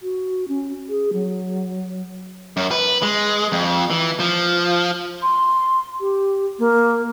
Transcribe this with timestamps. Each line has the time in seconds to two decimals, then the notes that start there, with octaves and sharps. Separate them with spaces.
0.02 F#4
0.48 C#4
0.89 G#4
1.13 F#3
2.57 F#2
2.71 B4
3.03 G#3
3.52 F2
3.90 E3
4.20 F3
5.23 C6
6.00 G4
6.59 A#3